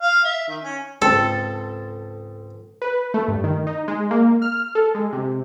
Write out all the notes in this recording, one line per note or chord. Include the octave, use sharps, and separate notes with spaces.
F5
E5
D#3
C#4
C#2 G#2 C4 A4
B4
A3
G2
D#3
D#4
G#3
A#3
F6
A4
G#3
C3